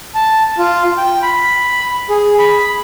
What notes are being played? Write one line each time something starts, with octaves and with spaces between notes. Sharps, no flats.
A5
F4
G5
B5
G#4
B5